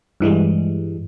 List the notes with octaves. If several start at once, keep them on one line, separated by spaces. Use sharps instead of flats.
G2 E3 G3 G#3